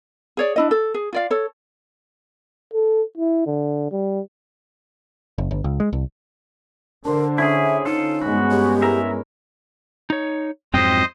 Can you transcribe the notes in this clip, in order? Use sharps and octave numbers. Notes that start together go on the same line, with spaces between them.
G#4 C#5 D5
D4 E4 D#5
A4
G#4
F4 D5 F5
A4 C#5
A4
E4
D3
G3
F#1
G1
C#2
G#3
C2
D3 D4 A#4 C5
C#4 E4 G#4 E5
D#4 F4 A4
G2 G#3 B3 F#4 B5
G4 A#4 C#5
E4 A#4 E5 A#5
D#4 C#5
F2 G#2 F#3 C4 C5 D#5 G5